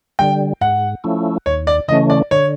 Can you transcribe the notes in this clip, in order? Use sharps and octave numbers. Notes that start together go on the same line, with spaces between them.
D3 G3 G5
G#2 F#5
F3 A3 C#4 E4
D#2 C#5
D5
C#3 E3 A3 C#4 D#5
D5
D3 C#5